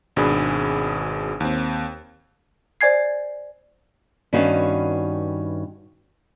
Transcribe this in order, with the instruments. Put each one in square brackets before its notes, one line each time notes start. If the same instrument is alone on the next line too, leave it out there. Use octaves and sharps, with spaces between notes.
[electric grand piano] G#1 B2 D4 G#4 B5
D#2 C4
[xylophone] C5 D5 G#5 G#6 C7
[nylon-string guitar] G2 D#3 B3 C#4 F#4 F5